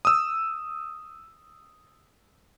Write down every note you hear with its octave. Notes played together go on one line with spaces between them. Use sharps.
D#6 E6